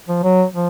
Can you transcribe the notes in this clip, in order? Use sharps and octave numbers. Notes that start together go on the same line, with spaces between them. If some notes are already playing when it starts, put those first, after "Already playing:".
F3
F#3
F3